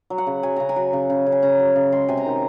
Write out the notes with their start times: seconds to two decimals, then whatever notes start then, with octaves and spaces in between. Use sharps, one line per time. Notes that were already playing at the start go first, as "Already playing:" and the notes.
0.10 F#3
0.18 F#5
0.27 C#3
0.43 F#3 G#5
0.56 C#3 A#5
0.69 G#5
0.76 F#3
0.93 C#3
1.10 C#3
1.26 C#3
1.32 G#5
1.42 C#3 A#5
1.59 F#3
1.76 C#3
1.92 G#3 C6
2.08 C3 G#5
2.17 A#5
2.26 D#3